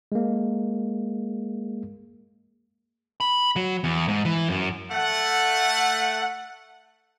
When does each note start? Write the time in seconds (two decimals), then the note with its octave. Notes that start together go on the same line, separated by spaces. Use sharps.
0.12 G#3 A#3
3.20 B5
3.56 F#3
3.84 E2
4.08 G#2
4.25 E3
4.49 F#2
4.92 A3 F#5